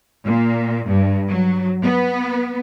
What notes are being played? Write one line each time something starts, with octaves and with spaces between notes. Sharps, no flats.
A#2
G2
F#3
B3